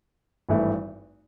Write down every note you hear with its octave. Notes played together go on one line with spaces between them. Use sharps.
G#1 G2 E3 A3